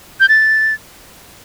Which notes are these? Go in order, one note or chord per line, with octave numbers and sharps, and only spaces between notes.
G6
A6